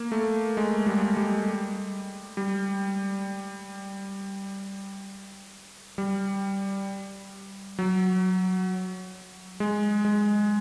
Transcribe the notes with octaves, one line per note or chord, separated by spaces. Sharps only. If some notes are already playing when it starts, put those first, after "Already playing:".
Already playing: A#3
A3
G#3
G3
G3
G3
G3
F#3
G#3
G#3